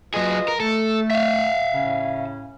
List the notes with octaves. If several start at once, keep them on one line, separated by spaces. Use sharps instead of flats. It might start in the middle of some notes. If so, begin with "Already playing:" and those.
F#3 F4 G#4 B4 D#5
A#4
A3 A4
E5 F5
A2 C#3 C#4